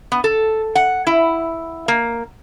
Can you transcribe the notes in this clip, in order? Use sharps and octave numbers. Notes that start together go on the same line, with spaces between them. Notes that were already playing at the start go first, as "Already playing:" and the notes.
B3
A4
F#5
E4
A#3